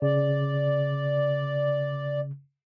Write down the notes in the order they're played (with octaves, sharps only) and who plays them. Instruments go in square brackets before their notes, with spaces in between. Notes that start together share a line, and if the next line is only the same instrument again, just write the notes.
[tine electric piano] C#3 [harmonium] D5